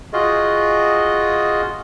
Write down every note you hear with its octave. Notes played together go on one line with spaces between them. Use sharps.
F4 F#4 G#4 D#5